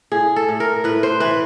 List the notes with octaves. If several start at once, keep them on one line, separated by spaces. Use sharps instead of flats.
A2 G#4
A4
A2
A#4
A2 B4
C5
E3 B4